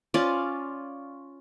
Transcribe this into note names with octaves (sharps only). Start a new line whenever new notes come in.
C#4 F4 D5